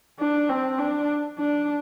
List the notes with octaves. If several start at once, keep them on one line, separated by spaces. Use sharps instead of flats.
D4
C4
D4
D4